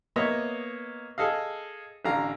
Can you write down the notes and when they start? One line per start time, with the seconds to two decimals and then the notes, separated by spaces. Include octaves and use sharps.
0.16 A#3 B3 C#5 D#5 E5
1.18 G#4 A4 D#5 F5
2.05 A1 D3 F5 A#5